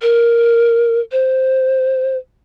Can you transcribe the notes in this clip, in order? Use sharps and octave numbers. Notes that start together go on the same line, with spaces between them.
A#4
C5